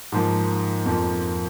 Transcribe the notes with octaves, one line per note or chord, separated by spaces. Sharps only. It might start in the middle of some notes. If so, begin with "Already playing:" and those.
G#2 F3 A#3
F2 F3 A#3